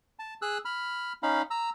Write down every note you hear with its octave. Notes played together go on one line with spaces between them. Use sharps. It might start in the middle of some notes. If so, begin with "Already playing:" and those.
A5
G#4 E6 F#6
B5 F6
C#4 D#4 F5 B5
A#5 E6